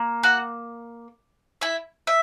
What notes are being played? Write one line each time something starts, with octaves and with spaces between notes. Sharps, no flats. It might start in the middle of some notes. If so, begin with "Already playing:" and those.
Already playing: A#3
F#4 F#5
E4 E5
E5